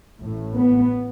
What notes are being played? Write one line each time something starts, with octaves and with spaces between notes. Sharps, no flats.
A1 A2
B3